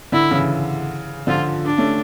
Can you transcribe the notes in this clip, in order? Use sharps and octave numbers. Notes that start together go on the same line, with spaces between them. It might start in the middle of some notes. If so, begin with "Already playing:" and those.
D3 E4
C#3 E3
D3 F3 F4
D4
A3 C#4